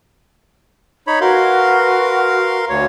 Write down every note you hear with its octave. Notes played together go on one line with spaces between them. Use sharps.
D#4 C#5 B5
F#4 A#4 B4 F5 C6
D2 C#5